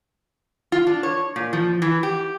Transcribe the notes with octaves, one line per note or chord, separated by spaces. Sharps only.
F4
D4
C#5
A#2
F3
E3
G4